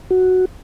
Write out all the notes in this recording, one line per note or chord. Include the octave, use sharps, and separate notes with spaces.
F#4